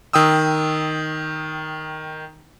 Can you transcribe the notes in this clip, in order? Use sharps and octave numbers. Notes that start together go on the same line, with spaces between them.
D#3 G5 D#6 E6